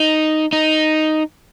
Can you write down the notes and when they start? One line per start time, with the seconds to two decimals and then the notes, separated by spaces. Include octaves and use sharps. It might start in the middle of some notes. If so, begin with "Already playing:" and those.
Already playing: D#4
0.53 D#4